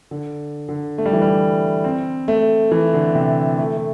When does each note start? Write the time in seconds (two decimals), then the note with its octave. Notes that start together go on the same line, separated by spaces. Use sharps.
0.11 D3
0.69 D3
0.98 A3
1.06 G3
1.13 E3
1.22 G3
1.84 C4
2.28 A3
2.72 E3
2.94 D3
3.15 C3
3.58 A3
3.77 A3